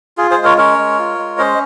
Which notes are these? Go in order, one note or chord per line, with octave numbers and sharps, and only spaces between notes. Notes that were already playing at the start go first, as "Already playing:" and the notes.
F4 G#4
G#4 C5
G#3
A#4 C#5
C#4 A#4 C#5
G#3
F4
G#3
C#4 C5 D#5